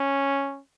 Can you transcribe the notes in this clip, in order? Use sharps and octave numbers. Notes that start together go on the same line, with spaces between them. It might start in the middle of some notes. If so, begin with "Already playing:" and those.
Already playing: C#4